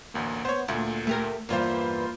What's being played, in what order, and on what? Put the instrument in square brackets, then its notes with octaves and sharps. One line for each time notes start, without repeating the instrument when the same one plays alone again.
[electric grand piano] A1 D2 A#3
[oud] B3 [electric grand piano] C5 C#5
[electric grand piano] D2 A#2 [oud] A3
[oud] A3 G4 A#4
[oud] E2 G2 E3 [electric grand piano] A#3 F4 C5